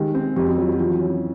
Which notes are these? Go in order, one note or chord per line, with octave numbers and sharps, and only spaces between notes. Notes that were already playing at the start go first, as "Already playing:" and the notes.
Already playing: D#3 G#3 G4
C4
F2 G4
F#4
F#3 F4
F#4
E3 F4
C#4